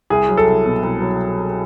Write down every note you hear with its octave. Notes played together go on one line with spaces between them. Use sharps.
C2 G#4
F#3
A4
C2
B2
C2
F#3